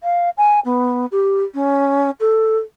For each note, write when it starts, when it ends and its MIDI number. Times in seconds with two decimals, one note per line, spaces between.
0.03 0.30 77
0.37 0.60 80
0.65 1.06 59
1.12 1.43 67
1.54 2.11 61
2.20 2.58 69